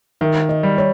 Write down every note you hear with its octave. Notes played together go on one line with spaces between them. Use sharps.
D#3 E5
D#5
G3
C#5